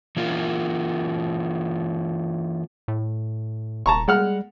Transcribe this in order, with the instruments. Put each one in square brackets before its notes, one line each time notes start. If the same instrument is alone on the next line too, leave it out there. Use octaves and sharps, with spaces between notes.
[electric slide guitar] E3 A#3 F4
[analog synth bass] A2
[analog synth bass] D#1 [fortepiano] A5 A#5 C#6
[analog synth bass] G3 [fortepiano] G#3 F#5 F6